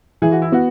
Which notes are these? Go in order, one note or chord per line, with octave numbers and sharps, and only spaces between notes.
E3 G#4
F#4
E4
B3 F#4